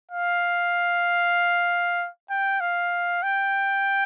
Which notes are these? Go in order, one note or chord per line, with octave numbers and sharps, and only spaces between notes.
F5
G5
F5
G5